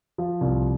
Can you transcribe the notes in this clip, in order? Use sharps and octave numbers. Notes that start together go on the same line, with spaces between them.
F3
C2